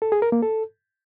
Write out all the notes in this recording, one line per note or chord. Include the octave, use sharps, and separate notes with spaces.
A4
G#4
A#4
A#3
A4